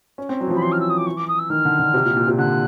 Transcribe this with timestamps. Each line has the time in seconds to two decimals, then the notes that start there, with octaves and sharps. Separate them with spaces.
0.18 C#4
0.29 C4
0.41 F#3
0.47 E3
0.50 F3
0.55 B5
0.62 E3 C6
0.72 F6
0.80 E6
0.89 D#6
0.97 D6
1.06 C#6
1.17 D6
1.28 D#6
1.38 E6
1.50 D#3 F6
1.65 D3
1.79 D3
1.94 C3
2.05 A#2
2.16 A#2
2.27 C3
2.38 D3 F#6